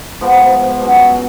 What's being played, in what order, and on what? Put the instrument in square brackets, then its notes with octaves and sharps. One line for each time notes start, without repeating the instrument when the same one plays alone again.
[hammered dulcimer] G#2 F3 B3
B2 F#3 C#4